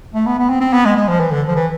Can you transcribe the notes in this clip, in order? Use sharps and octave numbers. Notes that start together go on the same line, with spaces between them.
A3
B3
B3
C4
C4
B3
G#3
G#3
F3
E3
D3
F3
E3